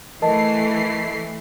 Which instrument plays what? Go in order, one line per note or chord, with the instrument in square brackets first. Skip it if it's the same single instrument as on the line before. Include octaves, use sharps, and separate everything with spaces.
[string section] E3 A3 C7 [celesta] A#4 D#5 A5